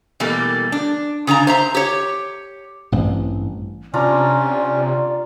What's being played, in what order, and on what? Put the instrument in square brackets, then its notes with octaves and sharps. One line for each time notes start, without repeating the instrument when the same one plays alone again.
[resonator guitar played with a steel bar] B2 E3 G3 A3 A#3
D4
C#3 D4 D#5 A#5
C5 E5 A#5
G4 C#5
[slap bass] A1 G2 C4
[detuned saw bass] C3 [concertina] C#4 [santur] D4 F4 A#5 [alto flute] D5